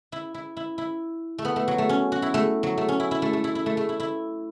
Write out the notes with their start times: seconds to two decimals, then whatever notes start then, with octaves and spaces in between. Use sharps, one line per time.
0.12 E4
0.34 E4
0.57 E4
0.78 E4
1.38 A3
1.45 B3
1.56 A3
1.68 F#3
1.78 A3
1.89 C#4
2.12 F#4
2.22 E4
2.34 A3
2.63 F#3
2.78 A3
2.88 C#4
3.00 E4
3.11 E4
3.22 A3
3.33 A3
3.44 E4
3.55 E4
3.66 A3
3.77 A3
3.89 E4
4.00 E4